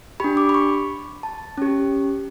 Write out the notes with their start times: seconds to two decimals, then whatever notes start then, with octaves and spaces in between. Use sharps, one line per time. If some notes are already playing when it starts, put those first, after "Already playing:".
0.20 D4 G4 B5
0.37 D6
0.49 B5
0.54 C#6
1.23 A5
1.57 C#4 G4